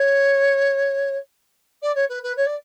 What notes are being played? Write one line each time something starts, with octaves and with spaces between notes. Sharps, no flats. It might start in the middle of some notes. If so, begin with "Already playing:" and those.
Already playing: C#5
D5
C#5
B4
B4
C#5
D5